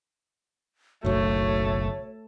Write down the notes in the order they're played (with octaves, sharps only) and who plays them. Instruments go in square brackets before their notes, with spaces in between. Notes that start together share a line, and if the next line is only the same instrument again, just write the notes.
[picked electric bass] F#1 B1 [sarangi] A3 [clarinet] F#4 [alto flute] C#5